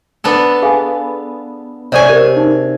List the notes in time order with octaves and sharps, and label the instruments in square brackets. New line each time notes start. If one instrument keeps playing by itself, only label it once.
[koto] B3 D4 A4
[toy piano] G#4 F5 G#5
[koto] C3 G#4 G#5 [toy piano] C#5 D5 C#6
[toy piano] G4 A#4 D5
D#4